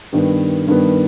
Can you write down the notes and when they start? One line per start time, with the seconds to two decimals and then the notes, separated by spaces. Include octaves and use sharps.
0.12 G2 D#3 B3
0.67 G2 D#3 B3